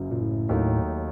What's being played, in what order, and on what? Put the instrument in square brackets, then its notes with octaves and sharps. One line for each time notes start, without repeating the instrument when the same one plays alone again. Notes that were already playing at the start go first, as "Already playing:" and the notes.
Already playing: [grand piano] F#1 F#2 F#3
[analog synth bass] A#2
A2
[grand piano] D#2 D#3 F#3 A3 D#4